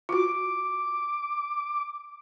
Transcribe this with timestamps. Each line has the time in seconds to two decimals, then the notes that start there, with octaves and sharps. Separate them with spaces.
0.09 F4 F#4 D6